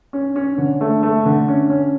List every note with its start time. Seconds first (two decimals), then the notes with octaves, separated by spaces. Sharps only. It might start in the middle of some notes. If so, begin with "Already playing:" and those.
0.13 C#4
0.36 C#4
0.58 D3
0.81 A3
1.03 A3
1.25 D3
1.48 C#4
1.70 C#4